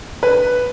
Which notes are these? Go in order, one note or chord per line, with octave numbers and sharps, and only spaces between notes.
B4